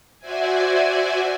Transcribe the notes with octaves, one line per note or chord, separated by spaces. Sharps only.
F#4 C5 D5 E5 G#5